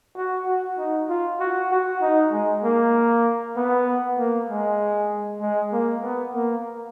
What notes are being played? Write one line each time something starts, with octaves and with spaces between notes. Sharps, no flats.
F#4
F#4
D#4
F4
F#4
F#4
D#4
G#3
A#3
B3
A#3
G#3
G#3
A#3
B3
A#3